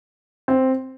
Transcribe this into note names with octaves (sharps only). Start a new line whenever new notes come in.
C4